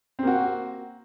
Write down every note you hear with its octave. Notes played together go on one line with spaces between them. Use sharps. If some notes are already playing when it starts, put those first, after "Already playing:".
A#3 C4 F#4